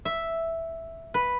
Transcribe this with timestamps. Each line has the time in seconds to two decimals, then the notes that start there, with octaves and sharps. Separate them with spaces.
0.05 E5
1.14 B4